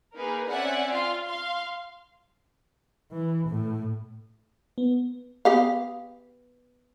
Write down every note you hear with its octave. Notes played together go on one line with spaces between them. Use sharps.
A#3 D#4 G#4 A#4 B4
C4 C#4 D5 E5 F#5 G#5
F4 F5 C6
F5 C6
E3
A2
B3
B3 G4 F5